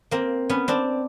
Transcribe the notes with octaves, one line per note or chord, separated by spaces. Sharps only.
A#3 C4
B3 C#4
C4 D4